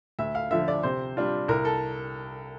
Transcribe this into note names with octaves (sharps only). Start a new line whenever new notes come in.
D2 E5
F5
D3 F3 E5
D5
C3 C5
G3 D4 F4
C2 A#4
A4